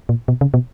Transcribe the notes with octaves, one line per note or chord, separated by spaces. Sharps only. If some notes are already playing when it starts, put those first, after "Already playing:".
A#2
B2
C#3
B2